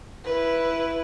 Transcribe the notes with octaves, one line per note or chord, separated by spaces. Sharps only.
E4 B4